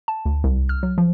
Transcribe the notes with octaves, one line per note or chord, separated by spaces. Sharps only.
A5
D2
C2
F6
F#3
F3